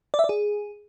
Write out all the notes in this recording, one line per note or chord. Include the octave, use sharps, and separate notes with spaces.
D5
E5
D5
G#4